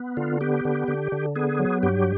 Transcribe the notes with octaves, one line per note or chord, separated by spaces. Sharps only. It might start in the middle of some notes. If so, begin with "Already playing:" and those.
Already playing: B3
D3 F4
B3 G4
D3
D3
D3
B3 G#4
F#3
G2 G4